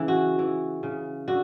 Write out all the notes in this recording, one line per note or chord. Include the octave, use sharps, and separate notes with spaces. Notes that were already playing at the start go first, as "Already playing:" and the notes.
Already playing: C#3 E3
F#4
E3
C#3
D3 F#4